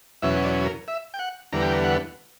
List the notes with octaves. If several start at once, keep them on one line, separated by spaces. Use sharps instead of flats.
E2 B2 F#3 C#4 E5
D5
A#4
E5
G5
F#5
E2 D3 G3 B3 A#5
G5
A#5
F#5